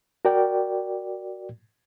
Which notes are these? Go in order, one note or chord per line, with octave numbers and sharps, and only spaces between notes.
F#4 A#4 D5 G5